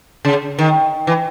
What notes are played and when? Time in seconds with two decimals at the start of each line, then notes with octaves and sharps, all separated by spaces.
0.25 C#3
0.59 D#3
1.07 E3